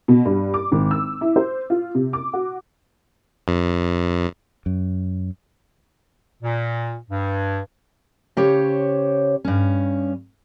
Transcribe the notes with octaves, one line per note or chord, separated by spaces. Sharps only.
B2
G2
D6
G#1
E6
E4
C5
F4
C3
D6
F#4
F2
F#2
A#2
G2
C#3 G4 C5 C#5
G2 C#4